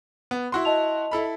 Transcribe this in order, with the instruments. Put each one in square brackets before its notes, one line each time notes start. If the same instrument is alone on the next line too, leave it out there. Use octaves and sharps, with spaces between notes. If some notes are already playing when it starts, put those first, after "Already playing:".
[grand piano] B3
E4 F#4 C6
[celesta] D#5 A5 F7
[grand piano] E4 A4 B5